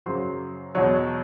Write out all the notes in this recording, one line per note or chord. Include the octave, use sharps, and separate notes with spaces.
F#2 C#3 F#3 C5 C6
E2 B2 F#3 C#5 C#6